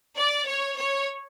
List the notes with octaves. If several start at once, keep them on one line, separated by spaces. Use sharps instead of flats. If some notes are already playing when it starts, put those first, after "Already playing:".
D5
C#5
C#5